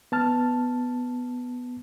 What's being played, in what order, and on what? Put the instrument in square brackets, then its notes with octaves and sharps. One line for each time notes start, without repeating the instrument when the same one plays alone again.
[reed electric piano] B3 A5 F6